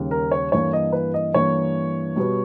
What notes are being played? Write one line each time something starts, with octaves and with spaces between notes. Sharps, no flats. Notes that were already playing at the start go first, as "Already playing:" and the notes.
Already playing: D#2 C#3 G3
A#4
C#5
G2 E3 A#3 C#5
D#5
B4
D#5
G2 E3 A#3 C#5
B2 G3 B3